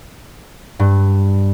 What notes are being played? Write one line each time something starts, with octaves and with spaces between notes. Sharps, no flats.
G2